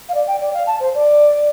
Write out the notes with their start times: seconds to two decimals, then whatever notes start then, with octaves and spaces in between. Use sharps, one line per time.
0.09 F5
0.14 D5
0.27 G5
0.40 D5
0.53 F5
0.66 A5
0.80 C5
0.94 D5